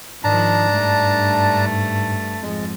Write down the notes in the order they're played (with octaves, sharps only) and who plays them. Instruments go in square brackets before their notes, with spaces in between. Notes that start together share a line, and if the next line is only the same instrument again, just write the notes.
[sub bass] G#2 [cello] D#3 F3 [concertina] D4 A5 A#5
[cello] G2 A3
[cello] F2 G#2 [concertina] G#3